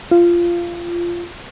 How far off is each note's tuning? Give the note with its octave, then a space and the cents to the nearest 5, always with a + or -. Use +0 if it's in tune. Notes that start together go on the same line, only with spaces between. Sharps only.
F4 -15